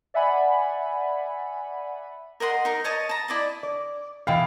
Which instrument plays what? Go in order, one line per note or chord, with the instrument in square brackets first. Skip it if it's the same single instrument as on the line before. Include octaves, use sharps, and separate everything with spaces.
[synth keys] D5 E5 F#5 G#5 B5
[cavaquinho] A#4 D#5 F#5 C6
D#4 A#4 A#5
C#5 D#5 A5 D#6
A5 A#5
E4 D5 D#5 A5
[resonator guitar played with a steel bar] D5
[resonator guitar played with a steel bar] B2 E3 G5 [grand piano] F5